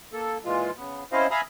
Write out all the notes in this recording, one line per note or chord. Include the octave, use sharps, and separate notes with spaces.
A#3 A4
A#2 E3 G#3 F4
C#3 B3
C4 C#4 E4 C5 D#5 F5
E5 F5 G#5 A#5 B5 D#6